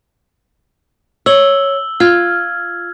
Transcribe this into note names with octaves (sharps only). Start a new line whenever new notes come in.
C#5 E6 F#7 G7
F4 F6 G#6